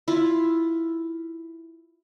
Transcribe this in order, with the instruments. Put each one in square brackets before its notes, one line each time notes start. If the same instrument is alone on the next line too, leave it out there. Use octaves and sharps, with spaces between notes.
[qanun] E4 F4